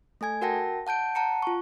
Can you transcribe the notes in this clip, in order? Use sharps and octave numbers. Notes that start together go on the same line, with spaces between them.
A3 A4 G#5 G#6
F#4 A#4 F#5 G5 A5 A#6
F#5 A5 G6 D7
F#5 A5 A#5 C#7
F4 C#6